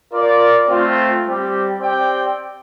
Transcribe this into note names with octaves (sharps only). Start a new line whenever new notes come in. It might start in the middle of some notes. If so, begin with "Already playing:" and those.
F4 A#4 D5
A3 C4 F4
G3 C4 G4
C4 G4 D5 G5